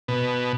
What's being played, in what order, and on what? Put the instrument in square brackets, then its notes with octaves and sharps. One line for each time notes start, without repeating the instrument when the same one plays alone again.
[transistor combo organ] B2